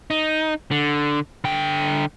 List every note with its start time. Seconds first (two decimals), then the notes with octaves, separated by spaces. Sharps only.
0.10 D#4
0.71 D3
1.44 D3 G5